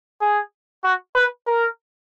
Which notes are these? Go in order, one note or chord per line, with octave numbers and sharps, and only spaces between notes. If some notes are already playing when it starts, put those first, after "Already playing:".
G#4
F#4
B4
A#4